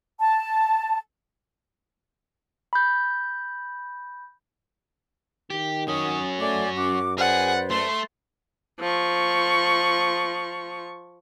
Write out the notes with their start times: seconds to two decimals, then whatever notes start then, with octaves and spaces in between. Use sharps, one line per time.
0.20 A5
2.73 B5 G6
5.50 D#3 G4
5.88 F#3 C#4 D#6
6.39 A3 D5 G#5 D6
6.76 F#2 F#4 D6
7.18 G#4 B4 C5 D5 F#5
7.71 A3 C6
8.80 F3 C#6